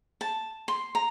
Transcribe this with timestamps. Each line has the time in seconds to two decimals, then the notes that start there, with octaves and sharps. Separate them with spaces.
0.21 A5
0.68 C6
0.95 A#5